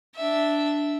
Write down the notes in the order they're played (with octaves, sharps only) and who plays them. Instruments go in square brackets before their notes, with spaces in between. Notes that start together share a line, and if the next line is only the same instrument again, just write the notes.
[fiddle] D4 E5